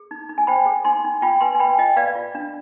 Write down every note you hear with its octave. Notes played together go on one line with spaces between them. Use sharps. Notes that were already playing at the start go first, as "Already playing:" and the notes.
Already playing: G#4
D#4
D#4
G#5
C5 G5 B5
G#4
D#4 G#5 C6
D#4
F4 G5 B5
B4 G#5 C6
G#5
B4 G5 B5
F4 D#5 G5
B4 D5 F5
F4
D4